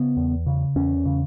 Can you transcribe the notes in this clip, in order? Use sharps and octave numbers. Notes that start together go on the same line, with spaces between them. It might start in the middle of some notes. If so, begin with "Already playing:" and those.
Already playing: C#3 B3
E2
C#3
E2 C#4
C#3